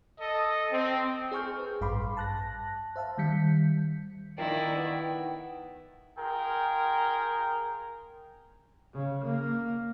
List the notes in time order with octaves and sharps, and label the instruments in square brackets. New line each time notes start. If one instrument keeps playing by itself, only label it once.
[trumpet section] A4 D#5
C4
[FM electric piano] G#4 C5 G#5 C#6 F6 G6
B4
A1 G2 F5 B5 C6 D6
A5 F#6 A#6
C5 E5 F5 A5
D#3 G3 G6 B6 C#7
[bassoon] A#2 [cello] D#3 [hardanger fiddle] E4 D5 [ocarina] G5
[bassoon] B3
[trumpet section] F4 G#4 A#4 G5
[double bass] C#3
A#3